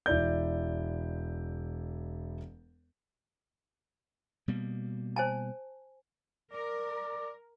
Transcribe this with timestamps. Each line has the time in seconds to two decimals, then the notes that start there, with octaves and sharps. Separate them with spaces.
0.06 E1 E4 D5 G6
4.48 B2 G3 A#3
5.16 C5 G#5 A5
6.53 A#4 D5